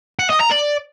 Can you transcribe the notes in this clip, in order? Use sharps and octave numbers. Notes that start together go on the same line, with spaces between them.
F#5
D#5
A#5
D5